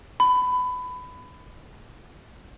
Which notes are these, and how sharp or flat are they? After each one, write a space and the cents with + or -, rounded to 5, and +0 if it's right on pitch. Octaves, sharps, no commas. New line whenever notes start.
B5 +20